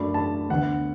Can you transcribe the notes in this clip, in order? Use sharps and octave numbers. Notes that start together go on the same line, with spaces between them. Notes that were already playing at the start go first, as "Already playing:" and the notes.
Already playing: F#2 F#3 A3 D4 B5
A5
D2 D3 B3 F#5